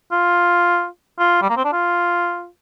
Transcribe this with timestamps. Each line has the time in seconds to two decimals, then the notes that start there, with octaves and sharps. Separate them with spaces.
0.12 F4
1.19 F4
1.42 G3
1.49 A#3
1.57 C4
1.64 D4
1.73 F4